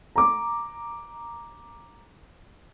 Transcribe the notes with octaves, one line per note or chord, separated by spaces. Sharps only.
A#5 D6